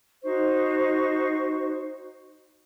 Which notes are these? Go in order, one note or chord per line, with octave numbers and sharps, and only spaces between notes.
D#4 F#4 C5 C#6